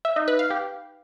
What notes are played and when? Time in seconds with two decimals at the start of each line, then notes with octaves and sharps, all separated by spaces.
0.05 E5
0.16 D#4
0.28 B4
0.39 F5
0.50 G4